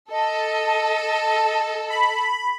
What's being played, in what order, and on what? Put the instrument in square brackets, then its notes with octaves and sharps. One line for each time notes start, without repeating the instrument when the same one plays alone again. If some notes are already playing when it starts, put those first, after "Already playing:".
[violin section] A4 [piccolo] D#5
[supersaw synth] B5